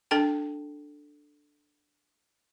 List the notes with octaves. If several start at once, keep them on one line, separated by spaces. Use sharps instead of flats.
D4 A4 G5 A5